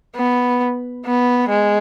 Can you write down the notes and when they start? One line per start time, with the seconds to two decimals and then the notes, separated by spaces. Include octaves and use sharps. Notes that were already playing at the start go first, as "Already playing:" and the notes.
0.16 B3
1.05 B3
1.49 G#3